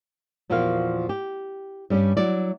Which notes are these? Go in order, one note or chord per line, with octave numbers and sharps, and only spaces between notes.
E2 A#2 F3 A#3 F#4 F5
G4
G2 G3 C#4
F#3 E4 D5